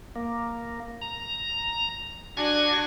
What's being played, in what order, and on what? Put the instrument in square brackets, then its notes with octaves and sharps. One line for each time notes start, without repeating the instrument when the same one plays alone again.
[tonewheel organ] A#3
A#5
[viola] D4 F#4 [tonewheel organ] G#5 C#6 G#6